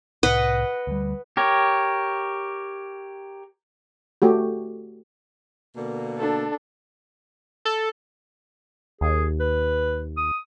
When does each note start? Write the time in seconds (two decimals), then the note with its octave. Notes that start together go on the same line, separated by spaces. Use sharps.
0.23 C2 A2 B4 D#5 F#5
0.87 D2 G3
1.37 G4 A#4 C#5
4.22 A3 F#4 G4
5.76 B2 D3 A#3
6.18 D4 A4
7.65 A4
9.01 D#2 G#4
9.40 B4
10.17 D#6